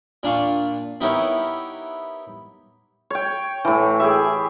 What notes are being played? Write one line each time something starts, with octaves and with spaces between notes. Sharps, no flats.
A#2 D4 F5 C#6
B3 D#4 E4 G4 A#4 C#5
C#5 G5
A2 E3
G4 G#4 E5